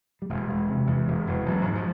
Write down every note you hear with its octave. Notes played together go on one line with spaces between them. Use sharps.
G3
E1 G#3
E1
C3
E2
E1
E1
A1 F#3
G#2
F3